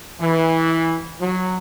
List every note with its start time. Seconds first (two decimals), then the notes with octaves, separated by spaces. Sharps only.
0.20 E3
1.21 F#3